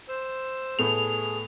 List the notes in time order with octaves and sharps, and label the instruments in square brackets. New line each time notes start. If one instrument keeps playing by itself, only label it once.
[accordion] C5 E6
[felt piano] A2 A3 B3 [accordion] G#4 [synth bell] F7